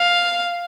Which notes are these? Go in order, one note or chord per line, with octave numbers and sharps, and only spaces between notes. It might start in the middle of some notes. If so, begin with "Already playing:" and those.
Already playing: F5